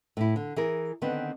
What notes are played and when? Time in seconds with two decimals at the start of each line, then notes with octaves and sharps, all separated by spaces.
0.17 A2 E4
0.36 D3
0.56 E3 G#4 A#4
1.02 D3 D#3 B3 C4 D4 B4